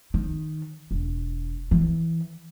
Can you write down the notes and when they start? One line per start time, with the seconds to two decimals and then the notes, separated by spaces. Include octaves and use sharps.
0.14 D#3
0.91 E1
1.71 E3